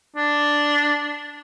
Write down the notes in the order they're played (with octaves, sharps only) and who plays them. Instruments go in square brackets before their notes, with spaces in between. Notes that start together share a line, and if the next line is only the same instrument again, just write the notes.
[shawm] D4